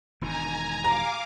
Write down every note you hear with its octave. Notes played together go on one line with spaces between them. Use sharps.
E1 G#2 D#3 G#5 A#5
F5 A#5 D6